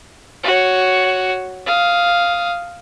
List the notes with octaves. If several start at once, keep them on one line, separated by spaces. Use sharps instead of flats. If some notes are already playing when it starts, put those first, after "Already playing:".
F#4 C#5
F5 D#6